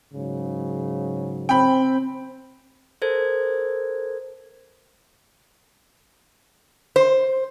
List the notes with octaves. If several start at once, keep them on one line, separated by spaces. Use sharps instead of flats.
G#2 C#3 F#3
C4 G5 B5
A4 A#4 C5 G#6
C5